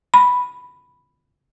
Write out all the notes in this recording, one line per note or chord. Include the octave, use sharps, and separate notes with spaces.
B5